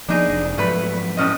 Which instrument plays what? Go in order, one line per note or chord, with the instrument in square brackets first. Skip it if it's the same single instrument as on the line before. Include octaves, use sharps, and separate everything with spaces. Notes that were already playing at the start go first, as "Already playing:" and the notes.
[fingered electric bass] F3 A#3 B3 [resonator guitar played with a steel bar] D4 D#4 G#4
[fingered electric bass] F1 F2
[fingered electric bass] G#2 F3 F#3 [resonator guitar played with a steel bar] A3 B4
[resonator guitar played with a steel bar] A2 C#4 D#5